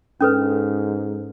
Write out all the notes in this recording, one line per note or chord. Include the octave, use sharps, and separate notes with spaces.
G#2 C#4 A4 B4